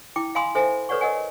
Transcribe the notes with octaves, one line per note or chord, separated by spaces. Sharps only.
E4 G5 D6
F5 G#5 B5 C6 D#6
A4 C5 E5 G#5
A4 B4 C#5 D5 F#5 C#6
A#4 D#5 F#5 G#5